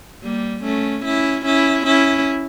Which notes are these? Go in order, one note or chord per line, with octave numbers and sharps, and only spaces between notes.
G3 A#3
A3 C#4
C#4 E4
C#4 E4
C#4 E4